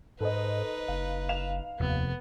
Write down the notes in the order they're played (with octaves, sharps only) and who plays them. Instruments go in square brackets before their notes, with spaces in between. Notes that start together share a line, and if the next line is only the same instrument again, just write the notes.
[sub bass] G#2 [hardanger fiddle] D#4 B4 [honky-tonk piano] A4 C5 D#5
[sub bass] F#1 [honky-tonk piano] F5
[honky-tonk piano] F5 E7 F7
[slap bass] F1 [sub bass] D#2 [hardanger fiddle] B3